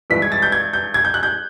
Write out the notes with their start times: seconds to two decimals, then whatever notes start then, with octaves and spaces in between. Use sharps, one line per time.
0.10 G2 E3 G#3 B6
0.22 G#6
0.32 A6
0.42 G6
0.52 G#6
0.73 G6
0.94 G#6
1.05 G6
1.14 F#6
1.23 G6